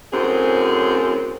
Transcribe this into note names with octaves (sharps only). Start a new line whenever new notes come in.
F#2 A2 C4 G#4